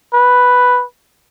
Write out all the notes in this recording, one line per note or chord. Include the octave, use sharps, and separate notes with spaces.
B4